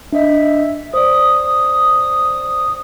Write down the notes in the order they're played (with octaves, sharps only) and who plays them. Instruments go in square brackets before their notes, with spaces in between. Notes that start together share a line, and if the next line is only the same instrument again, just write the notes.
[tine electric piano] D4 D#5 [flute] E5
[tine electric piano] C5 D5 [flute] D#6